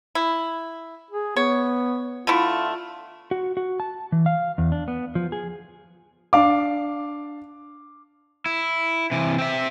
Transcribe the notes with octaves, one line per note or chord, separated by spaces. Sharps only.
E4
G#4
B3 C#5
D3 A3 E4 F4
F#4
F#4
A5
E3
F5
E2
D4
B3
F3
G#4
D4 F5 D6
E4
C3 E3
C4 E5